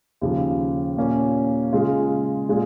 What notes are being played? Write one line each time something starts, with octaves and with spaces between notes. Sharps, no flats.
D#2 C#3 F3
A#2 A#3 C#4
C#3 G#3 F4 G#4
A#2 G#3 F4 G#4